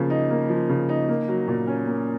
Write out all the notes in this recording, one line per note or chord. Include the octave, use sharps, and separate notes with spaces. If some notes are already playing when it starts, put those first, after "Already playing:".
Already playing: C#3 F3 A#3
D#4
A#3
F3
C#3
D#4
A#3
F#3
A#2
C#4
A#3